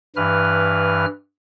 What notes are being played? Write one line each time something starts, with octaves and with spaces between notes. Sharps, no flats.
G2 E3 B4 F6